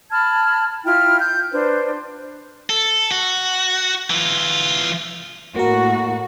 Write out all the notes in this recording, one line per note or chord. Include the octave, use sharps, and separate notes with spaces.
A5 B5 F6 G#6
E4 F4 G5 F6
G6
D4 B4 C5
A4
F#4
E3 F4
A2 A#3 F#4 A#4